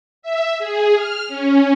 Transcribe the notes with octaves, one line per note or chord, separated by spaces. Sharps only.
E5
G#4
F6
C#4